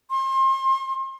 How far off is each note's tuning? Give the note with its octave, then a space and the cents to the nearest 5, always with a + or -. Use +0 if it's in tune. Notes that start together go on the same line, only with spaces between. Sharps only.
C6 +35